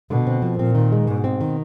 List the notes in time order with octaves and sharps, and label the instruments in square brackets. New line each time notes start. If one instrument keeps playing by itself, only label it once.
[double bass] B2 [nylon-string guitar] D3
[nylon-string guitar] C4
F3
[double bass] A#2 [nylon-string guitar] C4
[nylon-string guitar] D#3
G#3
[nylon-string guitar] G#2 [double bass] B2
[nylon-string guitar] C4
D#3